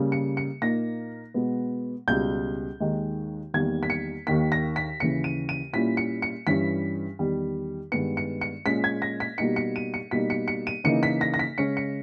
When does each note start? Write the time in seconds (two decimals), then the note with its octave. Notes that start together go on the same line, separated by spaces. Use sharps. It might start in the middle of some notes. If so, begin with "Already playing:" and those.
Already playing: C#3 G3 A#3
0.12 C#7
0.37 C#7
0.62 A#2 A#3 D#4 A#6
1.34 B2 G#3 B3
2.08 C#2 B2 G3 G6
2.80 D#2 D#3 G#3 D#4
3.54 E2 D#3 G3 A#3 G#6
3.83 B6
3.90 C#7
4.27 D#2 D#3 A#3 B6
4.52 A#6
4.76 B6
5.00 D#2 C#3 E3 C#7
5.24 D#7
5.49 D#7
5.73 A#2 G3 C#4 E4 B6
5.97 C#7
6.22 C#7
6.47 G2 E3 G3 C#4 B6
7.19 E2 D#3 G3
7.92 G2 D#3 G#3 B3 C#7
8.17 C#7
8.41 C#7
8.65 A#2 G#3 C#4 B6
8.84 G#6
9.02 A#6
9.20 B6
9.38 B2 G3 A#3 D#4 C#7
9.56 C#7
9.76 D#7
9.94 C#7
10.11 B2 G3 A#3 D#4 B6
10.30 C#7
10.48 C#7
10.67 D#7
10.84 C#3 E3 A#3 D#4 C#7
11.03 B6
11.21 A#6
11.34 A#6
11.39 B6
11.58 C#3 G#3 C#4 C#7
11.77 C#7